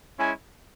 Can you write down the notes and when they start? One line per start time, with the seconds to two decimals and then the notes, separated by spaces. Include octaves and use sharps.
0.18 G#3 C#4 E4 G#5